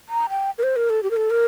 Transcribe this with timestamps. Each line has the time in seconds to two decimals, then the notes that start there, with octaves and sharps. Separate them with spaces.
0.09 A#5
0.29 G5
0.58 A#4
0.63 C5
0.76 A#4
0.90 A4
1.03 G4
1.11 A#4
1.17 A4
1.30 A#4